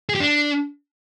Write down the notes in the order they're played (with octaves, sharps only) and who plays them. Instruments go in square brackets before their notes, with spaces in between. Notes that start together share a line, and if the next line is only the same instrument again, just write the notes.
[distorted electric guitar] G#4
G4
D4